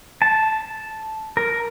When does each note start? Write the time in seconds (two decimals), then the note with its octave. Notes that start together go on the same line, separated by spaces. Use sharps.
0.22 A5
1.37 A#4